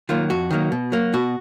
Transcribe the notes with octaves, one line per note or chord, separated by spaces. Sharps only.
D#3 F#3 A#3 F4
F2 F#4
D#3 F#3 A#3
B2
F#3 A#3
B2 F#4